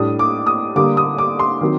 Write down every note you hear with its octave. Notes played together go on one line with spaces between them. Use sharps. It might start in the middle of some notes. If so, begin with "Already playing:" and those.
Already playing: A2 G3 D4 D#6
D6
D#6
D3 G3 A#3 D6
D#6
D6
C6
D#3 F#3 C4